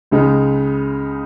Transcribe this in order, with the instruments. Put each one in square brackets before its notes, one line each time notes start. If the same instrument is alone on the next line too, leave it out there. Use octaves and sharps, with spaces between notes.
[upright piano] C#2 C#3 G#3 D#4